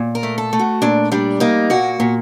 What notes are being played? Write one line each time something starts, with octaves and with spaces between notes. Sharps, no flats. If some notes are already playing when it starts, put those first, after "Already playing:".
Already playing: A#2
A#4
A3
A4
A3
F#4
A#2 D4
G3 D4
A#3 D#4
A#2 F#4
A#2